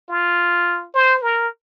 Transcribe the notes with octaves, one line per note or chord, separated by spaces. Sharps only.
F4
C5
A#4